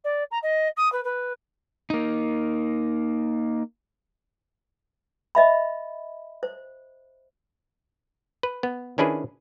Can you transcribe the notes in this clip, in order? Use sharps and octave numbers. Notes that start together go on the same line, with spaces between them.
D5
A#5
D#5
D#6
B4
B4
A#3 D#4
D#5 E5 B5
C5
B4
B3
D#3 C#4 D4 E4 G#4 B4